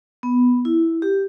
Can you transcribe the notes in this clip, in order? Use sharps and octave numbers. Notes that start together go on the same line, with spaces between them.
B3
E4
G4